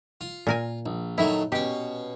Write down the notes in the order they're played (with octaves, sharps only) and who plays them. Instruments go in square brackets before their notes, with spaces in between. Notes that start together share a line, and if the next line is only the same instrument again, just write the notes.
[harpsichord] F4
[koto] A#2 A#4 G#5
[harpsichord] A#1
[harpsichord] D#3 F#3 A3 [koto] E4
[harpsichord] B2 C#4 [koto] G4